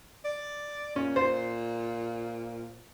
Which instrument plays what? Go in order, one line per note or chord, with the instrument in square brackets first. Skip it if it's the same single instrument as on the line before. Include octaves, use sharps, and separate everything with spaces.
[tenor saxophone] D5
[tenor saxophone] A#2 [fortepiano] C#4
[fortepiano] C5